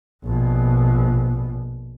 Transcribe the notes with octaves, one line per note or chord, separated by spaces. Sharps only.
A#1 B2